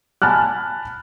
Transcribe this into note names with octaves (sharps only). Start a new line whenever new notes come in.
G#5 A5 B5 F6 F#6